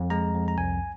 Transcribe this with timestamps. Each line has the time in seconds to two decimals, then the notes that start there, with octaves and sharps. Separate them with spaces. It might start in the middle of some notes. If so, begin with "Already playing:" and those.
Already playing: F2
0.10 G#3 A#5
0.35 F2
0.48 A#5
0.58 C2 G#5